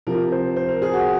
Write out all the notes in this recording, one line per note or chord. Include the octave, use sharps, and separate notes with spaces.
C3 F3 A#4
C5
C5
A#4
G#4
F#4